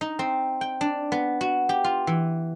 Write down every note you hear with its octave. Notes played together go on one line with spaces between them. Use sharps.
D#4
C4
G5
D4
B3
F#4
G4
F4
E3